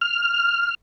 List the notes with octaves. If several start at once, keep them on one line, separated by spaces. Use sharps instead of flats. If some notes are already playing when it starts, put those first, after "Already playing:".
F6